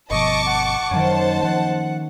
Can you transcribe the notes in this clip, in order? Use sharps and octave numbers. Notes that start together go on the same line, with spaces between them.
G1 B2 F3 D#5 A5 C#6 D6
F#5
F#2 D#3 F#3 A#3 C#4 C5 A5
F3 F#5